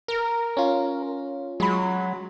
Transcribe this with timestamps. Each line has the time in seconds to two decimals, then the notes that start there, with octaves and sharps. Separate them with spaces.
0.08 A#4
0.57 C#4 F4
1.60 F#3 G#3 B5